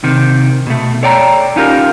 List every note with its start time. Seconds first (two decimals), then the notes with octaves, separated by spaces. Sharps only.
0.04 C3 D#3
0.67 B2 A3
1.03 A4 C#5 D5 G5 G#5 A#5
1.56 C#4 D#4 F4 G4 A#4